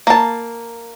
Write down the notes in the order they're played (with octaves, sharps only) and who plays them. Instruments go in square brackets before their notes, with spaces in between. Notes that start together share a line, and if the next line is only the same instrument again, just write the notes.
[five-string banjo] A#3 A5